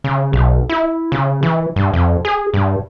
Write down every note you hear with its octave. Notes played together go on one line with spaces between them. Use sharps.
C#3
B1
E4
C#3
E3
G2
F2
G#4
G2